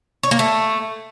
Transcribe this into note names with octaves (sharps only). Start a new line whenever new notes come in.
C#5
A#3
A3